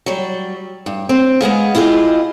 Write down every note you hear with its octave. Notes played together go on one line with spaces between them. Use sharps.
F#3 G3
G2
C4
G#3 B3 G#4 F5
E4 F4 G4 G#4 D#5